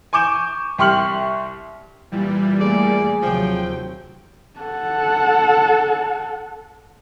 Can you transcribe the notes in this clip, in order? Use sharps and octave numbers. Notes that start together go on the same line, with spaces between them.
G#5 C#6 D6 G6 E7
C2 G4 C6 C#6 F6 F#7
A#2 E3 G3
A3 A#3 G#4 D5
D#2 C3 F3 F#3 G5
A4 F#5